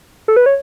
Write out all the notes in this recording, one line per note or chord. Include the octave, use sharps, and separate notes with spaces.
A4
B4
C#5